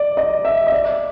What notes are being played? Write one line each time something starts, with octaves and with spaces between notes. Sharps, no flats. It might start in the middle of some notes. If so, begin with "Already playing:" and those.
Already playing: D5
D#5
E5
D#5
D5